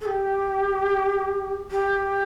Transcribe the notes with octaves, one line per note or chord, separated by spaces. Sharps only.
A4
G4
G4